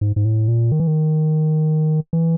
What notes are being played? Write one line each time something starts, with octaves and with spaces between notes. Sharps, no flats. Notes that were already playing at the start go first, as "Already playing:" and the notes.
G#2
G#2
A2
A#2
D#3
E3
D#3
E3